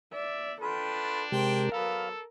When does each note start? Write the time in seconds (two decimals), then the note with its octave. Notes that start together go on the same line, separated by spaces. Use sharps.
0.12 D5 E5
0.61 D4 F4 A4 B4 G5
1.32 C3 G#3 G4 A#4 C5 G5
1.72 F#3 B3 A4 F5